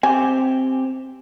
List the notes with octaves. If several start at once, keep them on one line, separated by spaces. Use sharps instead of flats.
C4 G4 G#5